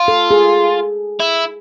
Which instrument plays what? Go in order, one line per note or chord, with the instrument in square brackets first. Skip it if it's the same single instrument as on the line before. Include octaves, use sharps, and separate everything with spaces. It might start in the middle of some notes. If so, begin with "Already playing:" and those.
Already playing: [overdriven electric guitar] F4
[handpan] A4
G#4
[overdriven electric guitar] E4